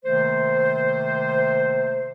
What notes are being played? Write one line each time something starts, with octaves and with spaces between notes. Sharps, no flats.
C3 D#3 A3 A#3 C5